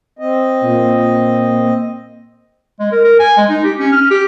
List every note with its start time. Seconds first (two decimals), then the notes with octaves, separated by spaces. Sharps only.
0.19 C4 D#5
0.61 A#2
2.80 G#3
2.92 A#4
3.05 A#4
3.20 G#5
3.37 G#3
3.50 D#4
3.64 G4
3.79 C#4
3.92 F6
4.11 G4